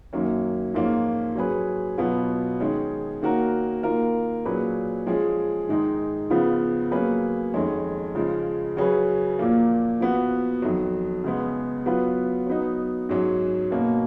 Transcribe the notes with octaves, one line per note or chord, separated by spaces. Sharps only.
F#2 D#3 F#3 A#3 C#4
G#2 F3 A#3 C#4 F4
F#3 C#4 G#4 B4
B2 F#3 B3 F4
D#3 G#3 C#4
D#3 A#3 C#4 F#4 A#4
D#3 A#3 F4 A#4
A#2 F#3 C#4 G#4 B4
F3 G#3 C#4 G#4
G#2 D#3 G#3 D#4
C#3 F3 B3 F4
F#3 A#3 C#4 G#4 B4
F2 D#3 G#3 C#4
C#3 F3 G#3
C#3 F#3 C#4 G#4 B4
A#2 F3 A#3
F3 B3 F#4
F2 D#3 F#3
C#3 G#3 B3
F#3 B3 F4 B4
F#3 B3 D#4
G#2 F#3 C#4
B2 A#3 C#4